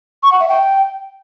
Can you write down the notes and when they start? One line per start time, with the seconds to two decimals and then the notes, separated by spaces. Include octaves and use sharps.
0.23 C#6
0.31 F#5
0.40 E5
0.48 G5